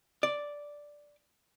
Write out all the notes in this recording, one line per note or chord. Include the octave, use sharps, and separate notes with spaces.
D5